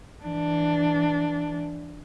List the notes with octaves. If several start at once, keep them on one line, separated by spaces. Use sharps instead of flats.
E3 D4